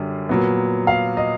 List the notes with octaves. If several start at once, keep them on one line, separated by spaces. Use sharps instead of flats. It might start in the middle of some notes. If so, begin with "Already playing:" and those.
Already playing: F#2 D3 G3
A#2 F#3 B3
F5
D#5